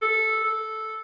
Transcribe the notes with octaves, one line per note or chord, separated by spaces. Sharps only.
A4
A4